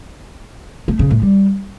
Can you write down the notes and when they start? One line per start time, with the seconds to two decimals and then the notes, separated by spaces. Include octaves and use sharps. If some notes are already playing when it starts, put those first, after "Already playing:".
0.88 A3
0.99 C#3
1.11 A2
1.22 G3